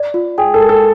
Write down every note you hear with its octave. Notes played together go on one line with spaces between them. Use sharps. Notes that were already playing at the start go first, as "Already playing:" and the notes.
Already playing: D5
F4
G#4 G5
A4
A#4
A4